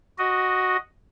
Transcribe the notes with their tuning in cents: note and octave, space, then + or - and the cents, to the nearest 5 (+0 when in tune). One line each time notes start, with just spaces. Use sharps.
F#4 +0 D#5 +0